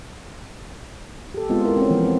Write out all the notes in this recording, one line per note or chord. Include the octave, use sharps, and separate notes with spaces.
G4 A4
G#3 B3 C4 F4
E4 A#4
C4 C#4
E3 F3 B3
C4